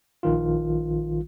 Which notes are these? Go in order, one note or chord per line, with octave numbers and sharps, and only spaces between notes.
A#1 D#3 F4